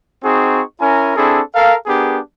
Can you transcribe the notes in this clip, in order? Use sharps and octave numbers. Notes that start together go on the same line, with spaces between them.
C4 D#4 F#4 G#4 C#6
C#4 E4 A#4 G#5 A#5
C4 D4 E4 G#4 A4
A4 A#4 F5
B3 D4 G4 G#4 A#4